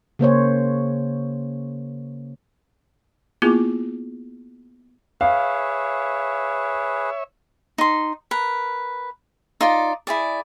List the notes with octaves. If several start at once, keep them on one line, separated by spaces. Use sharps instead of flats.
C#3 A#3 C5 C#5
A#3 B3 E4 F4 G#4 D6
G#4 B4 C#5 E5 F5
D#4 C6
A#4 B4
D#4 F4 D5
E4 G#4 D5